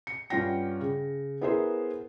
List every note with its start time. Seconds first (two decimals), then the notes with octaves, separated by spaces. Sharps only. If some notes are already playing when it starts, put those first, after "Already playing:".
0.07 C#7
0.30 G2 C#4 F4 F#5 G5 A#6
0.81 C#3
1.41 B3 E4 G#4 A#4 C5